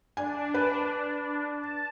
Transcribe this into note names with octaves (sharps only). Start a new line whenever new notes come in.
D4 G#5
B4
A5